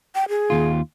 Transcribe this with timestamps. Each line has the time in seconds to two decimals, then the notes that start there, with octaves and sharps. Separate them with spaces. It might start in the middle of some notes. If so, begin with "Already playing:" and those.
0.15 G5
0.29 G#4
0.50 D#2 F4